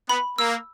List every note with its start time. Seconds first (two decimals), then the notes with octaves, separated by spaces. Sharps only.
0.09 B3 B5
0.38 A#3 E6